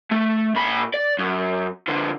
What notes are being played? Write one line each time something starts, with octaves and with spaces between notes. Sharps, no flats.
A3
A#2 B5
D5
F#2
D3 F3